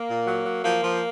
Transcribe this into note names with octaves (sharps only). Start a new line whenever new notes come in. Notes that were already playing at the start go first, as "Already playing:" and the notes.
Already playing: A#3
A#2
F#3
F#3
F3 A#3
F3